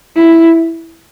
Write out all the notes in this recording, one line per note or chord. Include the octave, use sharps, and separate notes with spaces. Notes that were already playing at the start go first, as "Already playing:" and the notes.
E4